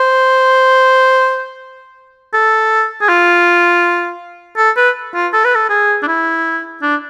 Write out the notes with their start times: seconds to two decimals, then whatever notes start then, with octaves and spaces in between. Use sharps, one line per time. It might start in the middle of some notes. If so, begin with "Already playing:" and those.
Already playing: C5
2.34 A4
3.02 G#4
3.09 F4
4.57 A4
4.77 B4
5.14 F4
5.33 A4
5.45 B4
5.55 A4
5.70 G#4
6.03 D4
6.08 E4
6.82 D4